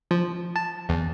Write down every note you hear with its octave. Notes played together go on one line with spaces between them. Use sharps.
F3
A5
E2